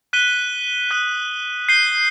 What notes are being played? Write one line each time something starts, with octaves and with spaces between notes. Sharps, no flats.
F#6 B6 D#7 G7
D#6 F#6 B6 F#7
G6 C7 D#7 G7